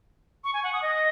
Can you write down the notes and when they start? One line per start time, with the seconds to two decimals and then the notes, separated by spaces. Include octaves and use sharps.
0.44 C#6
0.54 G#5
0.63 F#5
0.73 D#6
0.82 D#5